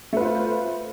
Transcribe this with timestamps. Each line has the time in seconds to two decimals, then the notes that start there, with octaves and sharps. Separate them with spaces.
0.13 A3
0.17 B4
0.21 F4
0.25 C5